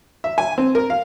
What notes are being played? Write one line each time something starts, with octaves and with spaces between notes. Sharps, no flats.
E5
G#5
C4
A#4
F5